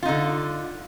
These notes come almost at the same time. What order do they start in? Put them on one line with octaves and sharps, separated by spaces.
F4 D#4 D3